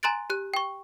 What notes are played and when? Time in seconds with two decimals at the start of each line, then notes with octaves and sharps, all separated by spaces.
0.03 G#5 A#5 C6 F#6 A6 D7
0.30 G4 F#6
0.54 G5 C#6